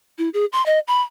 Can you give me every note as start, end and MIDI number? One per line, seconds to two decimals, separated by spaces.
0.19 0.29 64
0.34 0.45 68
0.53 0.64 84
0.66 0.79 75
0.88 1.01 83